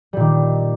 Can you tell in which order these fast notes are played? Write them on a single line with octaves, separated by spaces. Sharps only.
G3 A#2 D#3